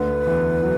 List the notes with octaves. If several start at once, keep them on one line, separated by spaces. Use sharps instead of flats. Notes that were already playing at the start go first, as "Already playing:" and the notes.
Already playing: D2 D3 B4
E2 E3
F#3